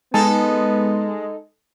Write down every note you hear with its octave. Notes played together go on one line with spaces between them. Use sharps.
G#3 B3 D#4 A4 G#5 A5